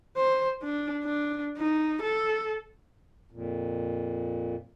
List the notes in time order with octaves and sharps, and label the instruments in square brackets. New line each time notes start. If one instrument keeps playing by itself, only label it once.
[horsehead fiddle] C5
D4
D4
D#4
A4
[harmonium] F2 A#2